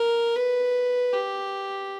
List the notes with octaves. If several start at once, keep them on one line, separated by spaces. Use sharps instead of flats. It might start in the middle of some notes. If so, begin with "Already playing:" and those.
Already playing: A#4
B4
G4